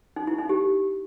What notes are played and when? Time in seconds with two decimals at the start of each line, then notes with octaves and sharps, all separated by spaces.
0.16 D#4
0.27 E4
0.38 D#4
0.49 G4